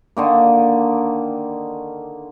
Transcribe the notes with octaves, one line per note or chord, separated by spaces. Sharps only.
D3 D#3 A#3